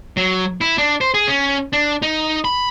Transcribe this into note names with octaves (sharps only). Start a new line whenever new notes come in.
F#3
E4
D4
C5
G#4
C#4
D4
D#4
B5